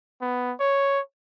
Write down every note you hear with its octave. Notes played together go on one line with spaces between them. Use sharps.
B3
C#5